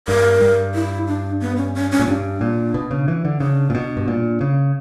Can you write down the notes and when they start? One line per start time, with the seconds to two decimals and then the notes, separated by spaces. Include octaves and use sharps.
0.08 G2 A#4
0.41 G2
0.75 E4
1.08 D4
1.41 B3
1.57 C#4
1.75 C#4
1.91 C#4
2.00 A#2
2.07 G2 D4
2.41 A#2
2.74 B2
2.91 C#3
3.08 E3
3.25 D3
3.40 C#3 D4
3.70 A#2
3.75 B2
3.97 G2
4.08 A#2
4.41 C#3